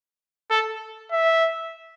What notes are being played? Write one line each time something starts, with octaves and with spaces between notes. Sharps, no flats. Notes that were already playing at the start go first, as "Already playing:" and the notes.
A4
E5